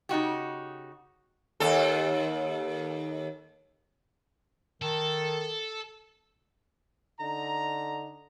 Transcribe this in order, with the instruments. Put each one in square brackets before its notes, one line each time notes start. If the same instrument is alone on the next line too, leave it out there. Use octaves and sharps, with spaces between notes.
[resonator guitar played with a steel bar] C#3 D#4 F#4 G4
[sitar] D#2 A4
[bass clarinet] D#3 [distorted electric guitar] A4
[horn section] D3 D#4 A#5